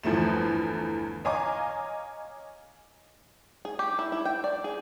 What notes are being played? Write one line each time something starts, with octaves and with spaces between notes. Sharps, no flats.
G1 E2 F3 A3 E7
C#5 D#5 F5 G#5 A#5 D6
G#4
G4
E4
E4
G5
D5
G#4